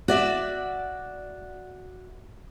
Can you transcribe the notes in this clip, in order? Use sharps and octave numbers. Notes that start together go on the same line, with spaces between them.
F#4 D5 E5